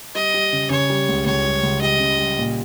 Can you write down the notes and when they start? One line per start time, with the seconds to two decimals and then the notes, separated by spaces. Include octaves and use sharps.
0.15 G3 D#5
0.34 G3
0.53 C#3
0.70 C#3 C#5
0.90 G3
1.08 C#2
1.26 C#2 C#5
1.45 G3
1.63 C#2
1.81 G3 D#5
2.00 C#3
2.19 G3
2.38 A#2